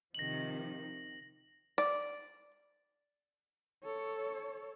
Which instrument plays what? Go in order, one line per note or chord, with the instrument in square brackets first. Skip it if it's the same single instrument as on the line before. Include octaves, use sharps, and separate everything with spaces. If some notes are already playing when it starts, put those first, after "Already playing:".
[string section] C3 D#3 F3 [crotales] A#6 F#7
[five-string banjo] D5
[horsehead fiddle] A4 C#5